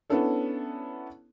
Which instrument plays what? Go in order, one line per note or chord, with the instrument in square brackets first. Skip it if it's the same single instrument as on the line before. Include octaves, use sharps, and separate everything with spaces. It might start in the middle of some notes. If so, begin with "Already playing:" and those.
[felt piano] B3 C#4 D4 E4 A4 C#5